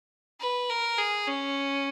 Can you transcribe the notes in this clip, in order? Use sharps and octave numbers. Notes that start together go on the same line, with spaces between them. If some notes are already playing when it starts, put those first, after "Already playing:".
B4
A#4
G#4
C#4